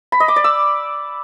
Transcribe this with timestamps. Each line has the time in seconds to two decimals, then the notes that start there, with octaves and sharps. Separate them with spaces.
0.12 B5
0.20 D#5
0.28 D6
0.36 D5
0.44 E6